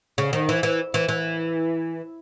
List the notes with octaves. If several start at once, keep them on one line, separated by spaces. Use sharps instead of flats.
C#3
D#3
E3
E3
E3
E3